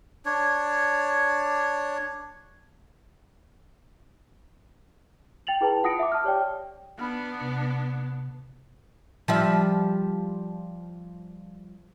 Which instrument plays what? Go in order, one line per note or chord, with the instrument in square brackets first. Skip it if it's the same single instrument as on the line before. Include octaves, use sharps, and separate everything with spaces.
[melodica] D4 C#5
[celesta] G5 A6 F7 F#7
E4 G#4 B4 G5 A5
F4 F#5 D#6 A#6 C#7 D7
E5 F#5 D6
A5 D#6 F6
G4 C#5 D5 G5
[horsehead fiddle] B3 D4 [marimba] B5 F6 F#6
[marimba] C3
[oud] F3 G3 E5